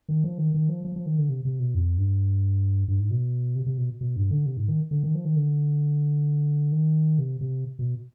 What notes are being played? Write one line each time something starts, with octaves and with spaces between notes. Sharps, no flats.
D#3
F3
D#3
D#3
F3
F3
F3
D#3
D3
C3
C3
B2
F2
G2
G2
G#2
B2
C3
C3
B2
B2
G2
D3
C3
G#2
D#3
D3
D#3
F3
D#3
D3
D#3
C3
C3
B2